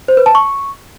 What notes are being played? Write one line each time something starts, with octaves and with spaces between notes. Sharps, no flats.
C5
B4
A5
C#6